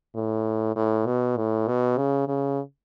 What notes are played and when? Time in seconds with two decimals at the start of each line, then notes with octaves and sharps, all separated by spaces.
0.15 A2
0.76 A2
1.06 B2
1.37 A2
1.68 B2
1.97 C#3
2.28 C#3